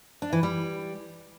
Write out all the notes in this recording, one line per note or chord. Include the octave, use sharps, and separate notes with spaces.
D4
E3
G3